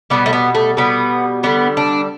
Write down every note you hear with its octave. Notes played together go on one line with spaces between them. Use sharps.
B2 G3 B3
A3
B3
A3
B2 G3 B3
D3 G3 B3
D4